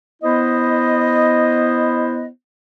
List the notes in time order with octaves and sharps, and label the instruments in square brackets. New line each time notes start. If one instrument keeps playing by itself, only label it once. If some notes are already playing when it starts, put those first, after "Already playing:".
[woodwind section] B3 E4 C5 D#5